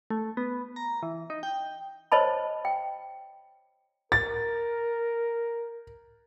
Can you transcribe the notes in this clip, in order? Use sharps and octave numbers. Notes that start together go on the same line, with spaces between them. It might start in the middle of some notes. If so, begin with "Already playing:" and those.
A3
B3
A#5
E3
D#4
G5
C5 C#5 D#5 A5 B5
G5
A#4 A6